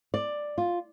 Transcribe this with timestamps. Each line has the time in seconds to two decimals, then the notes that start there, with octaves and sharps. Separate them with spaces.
0.14 D5
0.58 F4